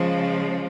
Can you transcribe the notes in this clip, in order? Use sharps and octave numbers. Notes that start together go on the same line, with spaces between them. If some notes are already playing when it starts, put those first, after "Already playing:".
Already playing: C#3 F3 G#3